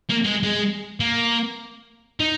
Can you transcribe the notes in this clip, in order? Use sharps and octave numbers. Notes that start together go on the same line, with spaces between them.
A#3
G#3
G#3
A#3
D#4